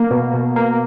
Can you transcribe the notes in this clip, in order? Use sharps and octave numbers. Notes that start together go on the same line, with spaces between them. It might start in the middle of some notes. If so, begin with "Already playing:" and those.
Already playing: A#3
B2
B2
A#3